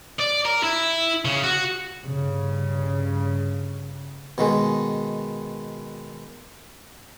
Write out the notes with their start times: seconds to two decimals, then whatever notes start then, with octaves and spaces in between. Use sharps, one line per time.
0.20 D5
0.46 A#4
0.63 E4
1.25 C#3
1.44 F#4
2.02 G2 C#3
4.38 B2 D#3 G#3